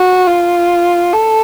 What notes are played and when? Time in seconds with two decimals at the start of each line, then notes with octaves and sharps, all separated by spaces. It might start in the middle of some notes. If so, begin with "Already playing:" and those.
Already playing: F#4
0.27 F4
1.13 A4